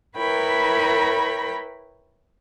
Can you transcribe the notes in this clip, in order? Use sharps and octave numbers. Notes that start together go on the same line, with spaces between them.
E4 A#4 B4 C#5 G5 B5